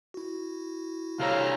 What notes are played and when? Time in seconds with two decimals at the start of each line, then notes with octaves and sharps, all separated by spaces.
0.14 E4 F#4
1.20 C3 G4 A4 C#5 F5 A#5